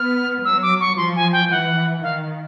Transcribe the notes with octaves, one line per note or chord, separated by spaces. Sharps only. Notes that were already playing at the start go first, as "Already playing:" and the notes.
Already playing: B3 F6
F#3 E6
D6
C#6
F3 C6
G#5
G5
E3 F#5
D#3 F5